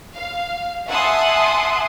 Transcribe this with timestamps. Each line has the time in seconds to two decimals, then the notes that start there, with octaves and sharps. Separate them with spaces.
0.14 F5
0.88 E5 F#5 G#5 A5 C6 D#6